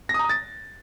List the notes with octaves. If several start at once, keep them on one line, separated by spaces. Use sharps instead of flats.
A#6
D#6
A#5
D#6
A6